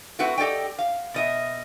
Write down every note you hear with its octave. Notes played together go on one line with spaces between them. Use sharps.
A3 C4 E4 F#4 B4 F#5
G4 A4 D5 D#5 G5
F5
B2 D#5 E5